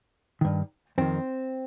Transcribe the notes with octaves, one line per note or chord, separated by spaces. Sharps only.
G2 D#3
F2 D#3 C4